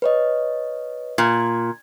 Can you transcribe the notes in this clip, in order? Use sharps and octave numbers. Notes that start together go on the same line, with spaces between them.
B4 C#5 D#5
A#2 G#6